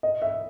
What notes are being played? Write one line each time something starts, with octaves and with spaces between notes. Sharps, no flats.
D#5
E5